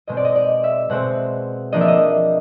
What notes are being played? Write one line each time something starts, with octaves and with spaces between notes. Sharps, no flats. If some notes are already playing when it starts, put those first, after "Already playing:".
B2 G#3 C4 D#5
D5
D#5
D5
E5
B2 G#3 C4 F#5
F3 A#3 D4 D#5
E5
D#5